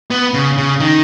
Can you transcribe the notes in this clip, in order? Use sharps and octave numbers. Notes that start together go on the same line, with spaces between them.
B3
C#3
C#3
D#3